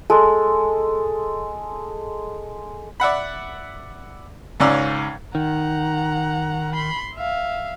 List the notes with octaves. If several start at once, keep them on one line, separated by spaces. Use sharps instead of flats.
G#3 A4
D5 E5 F#5 B5
C#2 G#2 C#4 D5 A#5 E6
D#3 F#5 A#5
B5 C6
E5 F5